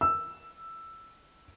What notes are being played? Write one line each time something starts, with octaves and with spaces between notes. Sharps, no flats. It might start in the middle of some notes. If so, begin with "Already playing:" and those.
E6